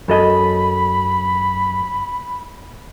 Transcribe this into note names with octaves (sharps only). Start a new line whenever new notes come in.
F#2 A4 D#5 B5